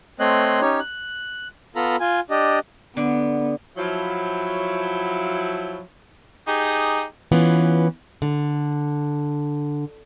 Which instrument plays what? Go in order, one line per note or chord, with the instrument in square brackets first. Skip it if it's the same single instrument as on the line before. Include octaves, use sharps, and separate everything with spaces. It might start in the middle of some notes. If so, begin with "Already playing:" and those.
[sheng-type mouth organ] A3 C4 C#5 D#5 C6 F#6
C#4 D#4 G4 C#5
F#6
B3 F4 A4 A#5 B5
F4 G#5
D4 G4 D#5
[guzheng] D3 [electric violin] B3
[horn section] F3 F#3 E4
[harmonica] D#4 G4 G#4
[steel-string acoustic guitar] E3 B3 C#4 F4
D3